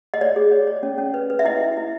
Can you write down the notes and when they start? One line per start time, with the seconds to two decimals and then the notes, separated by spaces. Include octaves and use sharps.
0.14 D#5
0.21 C#5 D5
0.36 G#4
0.52 C#5
0.67 C#5
0.83 C#4
0.98 C#4
1.14 B4
1.30 B4
1.39 E5
1.45 E4 D#5
1.60 E4
1.77 E4